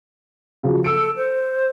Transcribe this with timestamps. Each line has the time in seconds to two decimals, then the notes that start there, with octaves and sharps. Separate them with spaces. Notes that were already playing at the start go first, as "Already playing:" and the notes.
0.63 C#3 F3 F#3
0.84 A4 E6 C#7 D7
1.17 C5